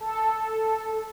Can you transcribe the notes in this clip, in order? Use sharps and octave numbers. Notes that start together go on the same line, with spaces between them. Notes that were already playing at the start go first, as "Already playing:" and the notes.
A4